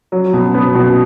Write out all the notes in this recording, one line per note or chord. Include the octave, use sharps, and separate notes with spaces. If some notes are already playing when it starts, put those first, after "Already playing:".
F#3
B2
B3
B2